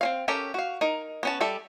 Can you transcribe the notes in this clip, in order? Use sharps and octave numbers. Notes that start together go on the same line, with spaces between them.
C4 C#4 F5
C#4 G4 A4 A#4
F#4 F5
D#4 A#4
B3 C#4 A5
G3 A4 E5 A5